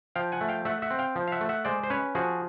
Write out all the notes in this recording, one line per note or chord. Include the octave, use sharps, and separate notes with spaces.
F3 F5 G5
F#5 G#5
A3
F5 G5
A3 E5 F#5
E5 F#5
C4
F5 G5
F3
F5
E5 F#5
A3
E5 F#5
G#3 C5 D5
C5
C#4 B4 C#5
F3 F#4 G#4